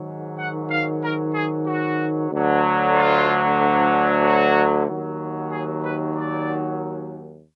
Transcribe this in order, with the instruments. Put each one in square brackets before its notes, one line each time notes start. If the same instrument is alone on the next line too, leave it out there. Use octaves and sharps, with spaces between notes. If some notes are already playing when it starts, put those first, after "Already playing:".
Already playing: [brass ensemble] G#2 D#3 F#3
F#5
F5
A#4
G#4
F#4
D2 D3 F#3
F4
F#4
D#2 D#3 F#3
G#4
B4
D5